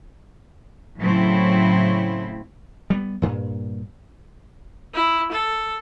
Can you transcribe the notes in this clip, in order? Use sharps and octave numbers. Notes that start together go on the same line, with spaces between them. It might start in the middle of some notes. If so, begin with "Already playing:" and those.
A2 C#3 F#3 A3 C4 E4
G3 G#3 B3
G2 A#2
E4
A4